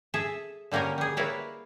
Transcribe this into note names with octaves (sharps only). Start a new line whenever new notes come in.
G#4 A4 E5
D3 G3 A#3 C#4 A#4
G3 G#4
A#3 E4 B4 C#5 D5